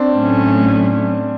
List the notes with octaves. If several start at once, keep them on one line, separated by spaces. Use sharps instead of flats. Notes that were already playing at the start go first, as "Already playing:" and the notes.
Already playing: C4 D4
A2 F#3 A3 C#4